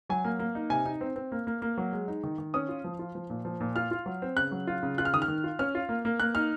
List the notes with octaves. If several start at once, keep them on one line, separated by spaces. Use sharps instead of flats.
F#3 G#5
A#3
A#3
D#4
C3 G#5
D#4
C4
C4
A#3
A#3
A#3
F#3
G#3
D#4
D#3
D#3
C#4 D#6
F4
F3
F4
F3
A#2
F3
A#2
F4 F6
F4
F#3
C4
C#3 F#6
F#3
F4
C#3
F4 F#6
F6
D#3 D#6
F6
D#3
F4
C#4 F6
F4
A#3
A#3
A#3 F#6
D#4 F6